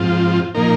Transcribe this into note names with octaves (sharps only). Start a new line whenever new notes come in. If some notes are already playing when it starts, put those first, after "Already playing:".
Already playing: G#2 F3 C4 F4
A#2 F3 A#3 D#4 A#4